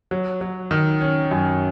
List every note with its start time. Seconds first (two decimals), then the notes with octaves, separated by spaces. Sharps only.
0.11 F#3
0.41 F#3
0.71 D#3
1.01 C#4
1.31 F#2